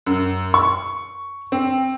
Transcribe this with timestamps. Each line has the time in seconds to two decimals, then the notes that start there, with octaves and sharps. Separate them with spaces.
0.07 F#2
0.54 C#6
1.52 C4